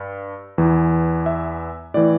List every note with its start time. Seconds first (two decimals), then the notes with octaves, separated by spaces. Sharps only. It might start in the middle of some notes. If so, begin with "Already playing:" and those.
Already playing: G2
0.58 E2 E3
1.26 E5
1.94 A2 E3 D5